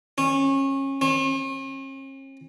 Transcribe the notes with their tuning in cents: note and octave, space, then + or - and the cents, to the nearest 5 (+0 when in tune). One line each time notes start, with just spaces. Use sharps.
C#4 -25
C#4 -45